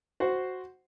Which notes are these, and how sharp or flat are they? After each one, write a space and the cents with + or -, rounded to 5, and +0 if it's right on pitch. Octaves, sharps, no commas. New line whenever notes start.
F#4 +0 C5 +0